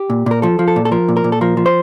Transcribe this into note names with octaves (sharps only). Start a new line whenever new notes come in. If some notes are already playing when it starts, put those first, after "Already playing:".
Already playing: G4
A#2
A#2 A#4
F3 A4
F3
A4
A#2
A4
F3 A#4
A#2
A#4
A#2
A4
F3 A#4
F3
C5